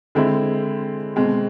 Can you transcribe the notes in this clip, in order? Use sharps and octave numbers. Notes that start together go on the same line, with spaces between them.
D3 G#3 C4 E4
B2 G#3 C4